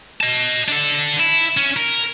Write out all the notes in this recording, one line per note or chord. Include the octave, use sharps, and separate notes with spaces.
D#5 A5
D4 A4
E4
C#4
A#4